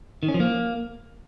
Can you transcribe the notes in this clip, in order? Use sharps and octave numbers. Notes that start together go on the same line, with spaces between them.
D#3
C#4
F3
A#3